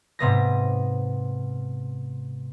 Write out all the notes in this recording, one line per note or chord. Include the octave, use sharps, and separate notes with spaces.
G#2 C3 B3 A#6